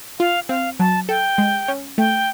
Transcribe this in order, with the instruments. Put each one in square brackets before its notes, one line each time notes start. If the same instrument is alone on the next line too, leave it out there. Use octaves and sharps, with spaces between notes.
[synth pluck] F4 [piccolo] F5
[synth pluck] C4 [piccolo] F5
[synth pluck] F#3 [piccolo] A5
[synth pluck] A4 [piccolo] G5
[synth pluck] G#3
C#4
[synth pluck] A3 [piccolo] G5